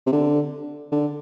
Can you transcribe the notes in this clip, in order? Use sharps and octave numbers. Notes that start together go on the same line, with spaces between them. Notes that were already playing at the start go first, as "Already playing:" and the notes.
C3
D3
D3